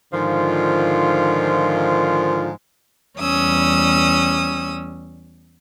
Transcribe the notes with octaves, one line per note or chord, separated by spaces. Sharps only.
G#2 D3 D#3 F3 F4
E2 G3 C#4 D#6 E6